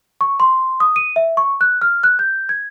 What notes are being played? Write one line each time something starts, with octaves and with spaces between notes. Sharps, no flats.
C#6
C6
D#6
D#7
E5
C#6
F#6
F6
F#6
G6
G#6